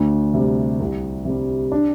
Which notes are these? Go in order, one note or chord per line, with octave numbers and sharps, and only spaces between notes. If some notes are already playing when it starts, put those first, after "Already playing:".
Already playing: D2 D4
C3 G3
C2
C3 G3
D4